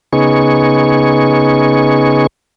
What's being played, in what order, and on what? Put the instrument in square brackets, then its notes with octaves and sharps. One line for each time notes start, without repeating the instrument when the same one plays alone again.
[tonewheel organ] C#3 B3 D#4 G#4 C#6